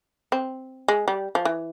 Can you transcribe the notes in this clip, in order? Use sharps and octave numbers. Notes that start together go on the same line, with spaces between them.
C4
G#3
G3
F3
E3